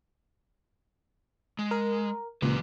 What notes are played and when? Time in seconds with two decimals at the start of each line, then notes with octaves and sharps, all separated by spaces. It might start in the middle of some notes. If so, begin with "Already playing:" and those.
1.59 G#3
1.71 A#4
2.42 C#2 A#2 E3 G4 B4